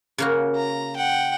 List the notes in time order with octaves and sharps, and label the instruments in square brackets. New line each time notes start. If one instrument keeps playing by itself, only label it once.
[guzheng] C#3 A#3 F#4
[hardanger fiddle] A#5
F#5 G5